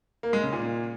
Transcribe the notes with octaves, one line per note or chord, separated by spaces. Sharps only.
A#3
G#3
C#3
A#2